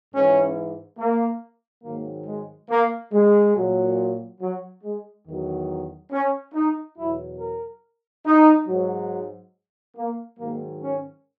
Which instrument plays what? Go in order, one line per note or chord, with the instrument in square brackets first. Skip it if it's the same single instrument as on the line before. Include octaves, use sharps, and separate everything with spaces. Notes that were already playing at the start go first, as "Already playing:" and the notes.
[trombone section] G#2 E3 C#4
A#3
G#2 D#3 F#3 A#3
G#3
A#3
G#3
A#2 F#3
F#3
G#3
E2 D#3 F#3
C#4
D#4
E2 B2 F#3 E4
A#4
D#4
G#2 F#3
A#3
G#2 D#3 F#3 A#3
C#4